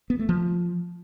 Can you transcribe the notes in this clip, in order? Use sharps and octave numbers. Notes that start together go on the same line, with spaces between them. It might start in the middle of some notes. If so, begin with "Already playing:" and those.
B3
A3
F3